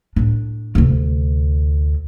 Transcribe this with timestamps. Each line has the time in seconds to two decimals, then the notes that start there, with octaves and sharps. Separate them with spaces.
0.16 A2 D4
0.75 D2 C3